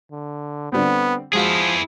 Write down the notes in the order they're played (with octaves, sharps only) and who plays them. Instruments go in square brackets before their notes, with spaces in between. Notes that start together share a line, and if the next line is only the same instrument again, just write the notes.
[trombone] D3
[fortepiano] D3 G3 C4 [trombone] B3
[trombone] F3 [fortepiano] G#3 F#4 F5 [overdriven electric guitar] E4 G#4